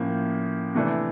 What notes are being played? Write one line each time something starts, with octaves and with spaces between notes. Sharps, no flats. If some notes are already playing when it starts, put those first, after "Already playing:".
Already playing: A2 F3 A#3 C#4
C3 E3 A3 D4